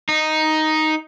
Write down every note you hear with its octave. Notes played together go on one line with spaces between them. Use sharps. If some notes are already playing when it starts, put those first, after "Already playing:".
D#4